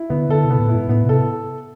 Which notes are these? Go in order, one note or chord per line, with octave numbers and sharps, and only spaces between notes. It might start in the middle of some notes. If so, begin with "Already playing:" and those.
Already playing: E4
D3 B3
D3 A4
C3
B2 B3
A2
E4
G#2
A2 B3
C3 A4